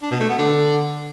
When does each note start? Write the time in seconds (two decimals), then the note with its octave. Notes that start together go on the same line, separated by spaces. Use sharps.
0.02 D4
0.11 B2
0.20 A3
0.29 B3
0.38 D3